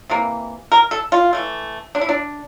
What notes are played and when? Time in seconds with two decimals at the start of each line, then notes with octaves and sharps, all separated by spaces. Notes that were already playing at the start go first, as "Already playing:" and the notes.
0.10 C3 E3 A#3
0.72 A#4
0.91 A4
1.12 F4
1.33 E3 A3
1.95 D4
2.01 E4
2.09 D4